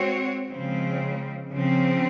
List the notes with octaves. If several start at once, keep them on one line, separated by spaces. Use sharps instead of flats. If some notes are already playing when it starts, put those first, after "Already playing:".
Already playing: G#3 C4 F#4 C#5
C#3 F3 G#3 C4
C#3 F3 C4